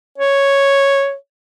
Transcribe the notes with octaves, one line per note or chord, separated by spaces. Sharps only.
C#5